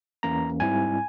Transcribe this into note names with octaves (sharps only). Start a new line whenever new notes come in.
E2 E3 A#3 C#4 A#5
G#2 G3 C4 E4 G#5